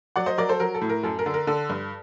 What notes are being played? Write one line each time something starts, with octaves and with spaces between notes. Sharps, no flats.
F#3 D5 F#5
C5 D#5
F#3 A#4 D5
A4 C5
F#3 A#4
A4
A2
A#4
F#2 A4
A#4
D3
A#4
D3 A4
G2